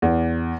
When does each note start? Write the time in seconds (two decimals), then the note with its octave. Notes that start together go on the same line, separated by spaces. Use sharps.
0.02 E2